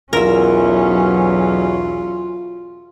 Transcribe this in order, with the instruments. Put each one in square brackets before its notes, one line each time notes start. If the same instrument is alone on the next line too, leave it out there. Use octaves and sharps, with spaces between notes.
[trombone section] B1 E2 [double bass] F#3 C#4 [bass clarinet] F4 [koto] A#4 E5